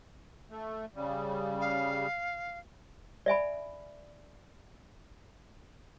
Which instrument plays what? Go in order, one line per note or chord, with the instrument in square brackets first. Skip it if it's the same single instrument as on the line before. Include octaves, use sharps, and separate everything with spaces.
[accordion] A3
C#3 G3
[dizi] F5
[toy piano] D5 E5 G#5 B5